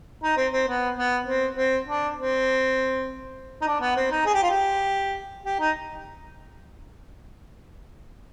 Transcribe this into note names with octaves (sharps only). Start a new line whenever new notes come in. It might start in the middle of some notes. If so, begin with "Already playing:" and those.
D#4
C4
C4
B3
B3
C4
C4
D4
C4
D#4
D4
B3
C4
D#4
G#4
G4
F4
G4
G4
D#4